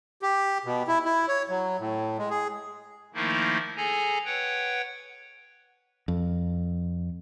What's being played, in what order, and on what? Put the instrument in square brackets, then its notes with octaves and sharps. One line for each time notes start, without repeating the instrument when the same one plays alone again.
[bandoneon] G4
B2
E4
E4
C#5
F#3
A2
G#3
G#4
[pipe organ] D#3 F3 A3 A#3 D#4 E4
G#4 A4 G#5 A#5
B4 C#5 F#5 G5
[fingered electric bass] F2